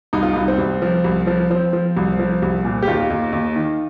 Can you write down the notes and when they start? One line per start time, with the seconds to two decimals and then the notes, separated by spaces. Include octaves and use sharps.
0.13 C2 D#4
0.23 F4
0.33 C2 D#4
0.48 C4
0.58 C2
0.82 F3
1.04 C2
1.27 F3
1.50 F3 C4
1.73 F3
1.97 C2
2.19 F3
2.42 C2
2.64 A#2
2.83 G4
2.87 D#2 F4
3.10 D#2
3.33 D#2
3.56 D#3